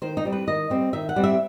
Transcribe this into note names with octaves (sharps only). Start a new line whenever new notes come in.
D#3 C5
D#4
G3 C4
B4
D#3 D#5
G3 C4
D#3 E5
F#5
G3 C4
E5